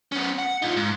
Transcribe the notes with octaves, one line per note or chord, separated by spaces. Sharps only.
B3 C#4
F#5
D#4 F4
G#2